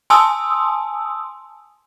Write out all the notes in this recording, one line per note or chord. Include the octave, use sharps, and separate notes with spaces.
G#5 A5 C6 D#6 E6